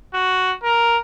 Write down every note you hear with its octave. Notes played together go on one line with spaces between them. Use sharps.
F#4
A#4